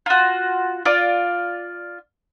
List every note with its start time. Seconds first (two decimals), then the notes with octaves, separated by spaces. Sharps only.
0.06 F4 F#4
0.85 F4 D5